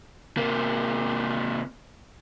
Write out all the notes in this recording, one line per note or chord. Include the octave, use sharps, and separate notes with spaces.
C3 A#3